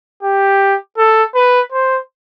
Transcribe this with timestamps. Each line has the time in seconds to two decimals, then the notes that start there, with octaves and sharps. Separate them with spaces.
0.23 G4
0.98 A4
1.35 B4
1.72 C5